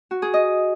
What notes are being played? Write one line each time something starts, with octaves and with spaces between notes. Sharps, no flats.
F#4
G#4
D#5